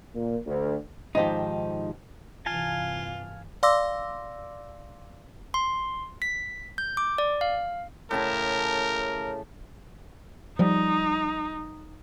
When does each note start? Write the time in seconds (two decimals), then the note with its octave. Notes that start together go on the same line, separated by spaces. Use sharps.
0.15 A#2
0.46 D2
1.15 G#2 D#3 F3 D#4 G4
2.46 G2 C3 E3 F4 F5 G#5 A5
3.63 D5 F5 C6 D6 E6 A#6
5.54 C6
6.22 B6
6.78 G6
6.97 D6
7.18 D5
7.41 F5
8.11 A2 C#3 A#4 A5
10.59 F3 G3 D#4